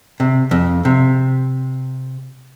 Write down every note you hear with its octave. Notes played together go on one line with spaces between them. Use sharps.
C3
F2
C3